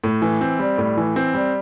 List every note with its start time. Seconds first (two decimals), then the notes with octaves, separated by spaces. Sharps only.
0.04 A2
0.22 E3
0.41 C4
0.59 G3
0.78 A2
0.97 E3
1.16 C4
1.34 G3